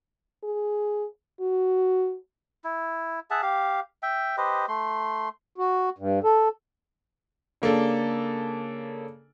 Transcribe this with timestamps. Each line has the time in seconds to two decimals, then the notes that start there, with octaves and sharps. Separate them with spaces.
0.44 G#4
1.41 F#4
2.64 E4
3.30 G#4 E5 F#5 A5
3.42 G4 F5
4.03 E5 G5
4.37 G4 B4 C5 D#5
4.68 A3 C6
5.58 F#4
5.98 G2
6.24 A4
7.62 C#3 A#3 D4 A4